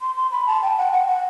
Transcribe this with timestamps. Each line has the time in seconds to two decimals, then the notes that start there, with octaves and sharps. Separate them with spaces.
0.01 C6
0.16 C6
0.31 B5
0.47 A5
0.62 G5
0.78 F#5
0.93 F#5
1.08 F#5